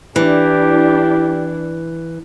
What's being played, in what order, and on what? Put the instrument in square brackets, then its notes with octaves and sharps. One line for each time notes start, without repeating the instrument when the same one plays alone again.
[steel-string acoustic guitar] E3 [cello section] D4 E4 [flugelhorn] G4